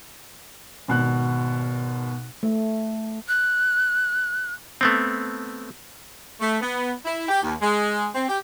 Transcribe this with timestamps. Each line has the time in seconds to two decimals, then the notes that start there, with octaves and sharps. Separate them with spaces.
0.88 G#1 B2 F#6
2.43 A3
3.28 F#6
4.81 A3 B3 C4
6.40 A3
6.61 B3
7.05 E4
7.29 G4
7.42 D#2
7.61 G#3
8.14 C4
8.29 G4